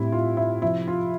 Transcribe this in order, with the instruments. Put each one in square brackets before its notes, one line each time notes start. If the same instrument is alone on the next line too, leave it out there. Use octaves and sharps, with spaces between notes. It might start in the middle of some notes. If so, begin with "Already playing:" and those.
Already playing: [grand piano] A2 G3 C4 E4
F4
E4
C3 F3 C4 E4
F4